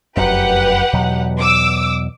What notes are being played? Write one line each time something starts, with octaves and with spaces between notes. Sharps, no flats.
F1 F#2 G4 B4 F#5
E2 B2 F#3
D6 E6